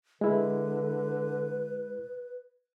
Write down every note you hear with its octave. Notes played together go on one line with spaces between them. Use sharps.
D3 G#3 E4 B4